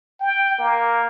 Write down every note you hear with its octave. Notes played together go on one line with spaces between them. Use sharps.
G5
A#3